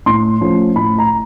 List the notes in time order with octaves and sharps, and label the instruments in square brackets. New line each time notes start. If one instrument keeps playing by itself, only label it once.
[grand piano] A2 C6
F3 A3 C#4
A2 B5
A#5